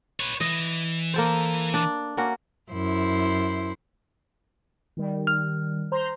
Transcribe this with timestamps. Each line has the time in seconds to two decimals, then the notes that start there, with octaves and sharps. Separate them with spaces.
0.20 B4 C#5
0.41 E3 D#5
1.14 A#3 A4 C5
1.74 D4
2.17 A#3 C#4 F#4
2.72 F#2 E4 C5
4.97 D#3 G3
5.27 F6
5.92 C5 A#5 C6